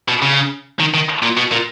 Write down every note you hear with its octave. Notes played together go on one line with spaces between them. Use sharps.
B2
C#3
D#3
D#3
A#2
B2
A#2